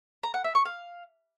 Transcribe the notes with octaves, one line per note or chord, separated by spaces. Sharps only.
A#5
F#5
E5
C#6
F5